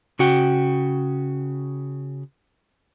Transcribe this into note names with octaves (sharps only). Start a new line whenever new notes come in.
C#3 F#4 G5